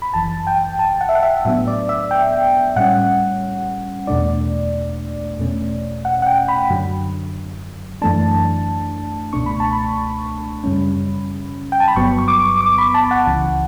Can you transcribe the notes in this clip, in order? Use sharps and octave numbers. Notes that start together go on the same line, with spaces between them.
B5
G1 F#2 E3 A5
G5
A5
F#5
E5
F#5
E5
A2 F#3 B3 D4 E5
D5
E5
G5
A2 G3 C#4 F#5
E2 B2 A3 D4 D5
E2 B2 A3 C#4
F#5
F#5
G5
B5
F#2 D3 F#3
F#2 E3 A3 D4 A5
C#2 B2 A3 D4 C#6
B5
A5
B5
F#2 C#3 G3 C#4
G5
A5
B5
G1 G2 F#3 B3 C#6
C#6
D6
D6
B5
A5
F#5
C#2 C#3 E3